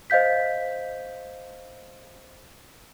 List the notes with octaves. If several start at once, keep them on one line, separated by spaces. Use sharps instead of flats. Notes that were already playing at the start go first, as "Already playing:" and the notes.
C5 D#5 F5 G6 B6